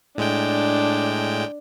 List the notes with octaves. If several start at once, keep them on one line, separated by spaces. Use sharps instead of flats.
A2 G#3 D4 G5